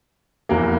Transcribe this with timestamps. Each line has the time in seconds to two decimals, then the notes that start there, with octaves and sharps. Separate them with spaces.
0.49 F1 E2 E3 A#3